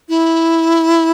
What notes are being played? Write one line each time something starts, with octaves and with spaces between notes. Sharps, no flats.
E4